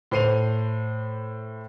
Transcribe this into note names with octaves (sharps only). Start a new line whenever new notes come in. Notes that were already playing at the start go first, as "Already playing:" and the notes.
A2 C5 C7 D#7 F7